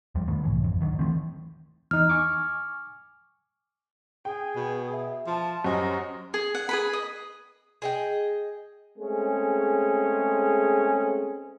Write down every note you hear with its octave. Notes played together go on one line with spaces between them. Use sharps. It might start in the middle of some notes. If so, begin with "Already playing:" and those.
E2 F3 G3
G2 D#3 A3 B3
C2 A2 E3
G#1 F2
D1 D#3 F#3 D4
D#3 E3 A3 C4
E2 D#4 F6
G#5 C#6 D6
G#4 G5
B2
E5
F3 A5
F#2 F#4 G4 C5 D#5 G#5
G#4
F#5
G#4 B4 B5
D#5
G#4 D#5 G5
G#3 A3 C4 C#4 G#4